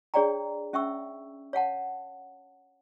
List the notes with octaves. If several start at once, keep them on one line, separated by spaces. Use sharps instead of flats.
D4 G#4 C#5 D5 G5 A#5
C#4 E5 G5 C#6 E6
C#5 F5 F#5 A5